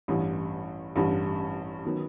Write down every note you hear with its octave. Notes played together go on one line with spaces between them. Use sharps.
A1 G2 E3
A1 G2 E3
D#3 F#3 B3